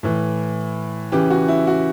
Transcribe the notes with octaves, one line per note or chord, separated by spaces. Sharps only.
A2 E3
C#3 E3 G4
F#4
E4
F#4